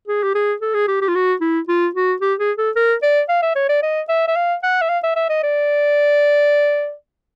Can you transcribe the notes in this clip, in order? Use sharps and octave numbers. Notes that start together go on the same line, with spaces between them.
G#4
G4
G#4
A4
G#4
G4
G4
F4
F#4
E4
F4
F#4
G4
G#4
A4
A#4
D5
F5
E5
C#5
D5
D#5
E5
E5
F5
F#5
E5
F5
E5
E5
D#5
D5